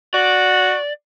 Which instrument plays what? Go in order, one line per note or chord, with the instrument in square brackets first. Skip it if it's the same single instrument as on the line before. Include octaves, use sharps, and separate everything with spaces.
[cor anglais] F#4 [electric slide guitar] D5